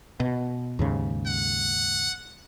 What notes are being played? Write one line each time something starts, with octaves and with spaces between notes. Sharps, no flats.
B2
D#2 G#2 C#3
F#5